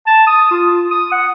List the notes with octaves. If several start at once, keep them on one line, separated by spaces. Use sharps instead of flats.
A5
D#6
F4
D#6
F#5